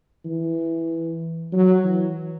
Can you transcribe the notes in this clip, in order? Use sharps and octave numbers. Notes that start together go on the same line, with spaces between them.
E3
F#3
E3